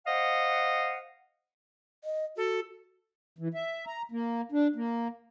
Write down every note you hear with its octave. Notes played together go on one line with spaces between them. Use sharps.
C5 D#5 F5 F#5
D#5
F#4 A4
E3
E5
A#5
A#3
D4
A#3